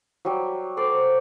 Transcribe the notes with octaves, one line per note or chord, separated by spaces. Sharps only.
F#3 G3
A4 C5 D5